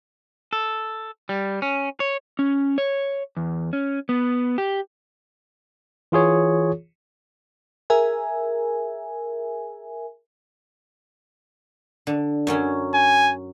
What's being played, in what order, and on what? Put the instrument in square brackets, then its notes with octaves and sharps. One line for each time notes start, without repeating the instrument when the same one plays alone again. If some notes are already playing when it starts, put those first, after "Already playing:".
[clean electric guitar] A4
G3
C#4
C#5
[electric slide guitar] C#4
C#5
E2
C#4
B3
G4
[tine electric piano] E3 F4 G#4 C#5
[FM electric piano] G#4 A#4 E5 G#5
[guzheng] D3
F#2 F#3 C#4
[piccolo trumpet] G#5